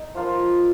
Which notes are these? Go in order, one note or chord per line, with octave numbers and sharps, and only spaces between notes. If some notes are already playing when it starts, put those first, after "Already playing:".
Already playing: D#4
F3 A#3 F4